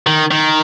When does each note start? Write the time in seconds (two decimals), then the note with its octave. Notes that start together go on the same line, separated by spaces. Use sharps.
0.07 D#3
0.31 D#3